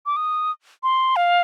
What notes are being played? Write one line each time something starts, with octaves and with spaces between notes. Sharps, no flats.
D6
D#6
C6
F5